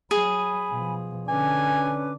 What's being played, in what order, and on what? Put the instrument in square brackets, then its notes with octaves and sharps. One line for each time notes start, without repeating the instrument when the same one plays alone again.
[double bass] F#3 [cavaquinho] G#4 [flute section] G#5 B5
[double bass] B2 F3
[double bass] D3 D4 [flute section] C#4 B4 D6 [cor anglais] G#5